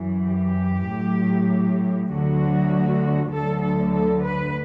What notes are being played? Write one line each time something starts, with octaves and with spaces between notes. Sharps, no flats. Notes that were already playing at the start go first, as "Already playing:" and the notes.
Already playing: F#2 E3
G4
A2 F#3
D2 D3 F#3 F#4
D2 D3 F#3 A4
A4
A4
B4